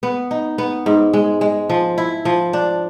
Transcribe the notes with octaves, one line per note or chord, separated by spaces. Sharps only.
B3
D#4
B3
G#2
G#3
G#3
F3
E4
F3
D4